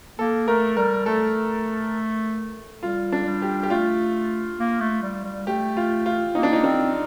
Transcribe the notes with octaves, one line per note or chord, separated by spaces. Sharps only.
A#3 A4
A3 A#4
G3 A#4
A3 A4
G3 F4
D4
G3
G4
G4
A3 F4
A#3
A3
G3
G3
A3 G4
F4
F4
A#3 D#4
D4
D#4
C4 D4